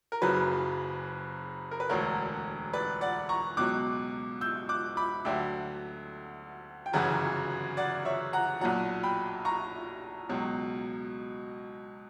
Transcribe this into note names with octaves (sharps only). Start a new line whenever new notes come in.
A#4
F#1 F#2 C#3 F#3 B4
A#4
B4
E1 D2 D3 A#4 C#5
B4 D5
D5 F#5
A#5 C#6
C#2 B2 F#3 D6 F#6
E6 G6
D6 F#6
B5 D6
D2 D3 F#3 E5 G5
G5
G1 F#2 C#3 E3 F#5 A#5
D5 F#5
C#5 E5
F#5 A#5
B1 A#2 F#3 F#5 A#5
G5 B5
A#5 C#6
C#2 B2 F#3